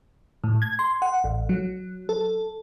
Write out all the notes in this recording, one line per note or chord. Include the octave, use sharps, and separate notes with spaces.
A2
G#6
C6
F#5
A1
F#3
A4